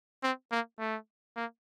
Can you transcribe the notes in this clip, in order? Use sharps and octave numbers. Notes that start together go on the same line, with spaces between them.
C4
A#3
A3
A#3